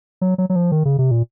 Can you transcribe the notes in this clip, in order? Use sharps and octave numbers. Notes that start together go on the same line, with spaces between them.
F#3
F#3
F#3
F3
D#3
C#3
C3
A#2